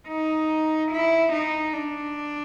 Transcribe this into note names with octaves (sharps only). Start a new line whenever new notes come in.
D#4
E4
D#4
D4